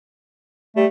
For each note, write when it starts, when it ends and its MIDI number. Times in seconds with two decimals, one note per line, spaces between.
0.76 0.86 55
0.76 0.86 57